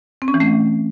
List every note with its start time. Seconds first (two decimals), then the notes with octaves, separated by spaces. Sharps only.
0.22 C4
0.28 C#4
0.34 E3
0.40 A3